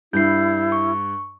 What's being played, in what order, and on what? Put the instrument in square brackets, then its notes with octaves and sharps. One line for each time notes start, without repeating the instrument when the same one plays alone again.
[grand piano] G2 [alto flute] E4 [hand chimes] G6 C7
[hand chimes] C#6